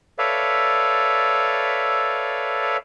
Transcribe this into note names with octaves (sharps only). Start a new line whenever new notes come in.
A4 B4 C#5 D5 E5 F5